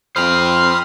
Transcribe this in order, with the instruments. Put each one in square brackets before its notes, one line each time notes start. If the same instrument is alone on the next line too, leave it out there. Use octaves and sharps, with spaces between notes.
[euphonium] F2 [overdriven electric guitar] C5 G5 [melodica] B5 C6 D#6 [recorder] F6